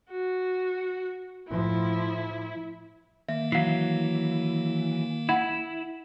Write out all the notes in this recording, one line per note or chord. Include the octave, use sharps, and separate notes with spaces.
F#4
A2 F3 E4
D#3 A#3 E5
E3 F#3 F5 C7
E4 F#5 B5 G#6